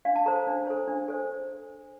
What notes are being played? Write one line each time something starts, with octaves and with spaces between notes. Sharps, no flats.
D4 F5
A5
A4 C5 A#5
A5
D4
A4 C5
D4
A4 C5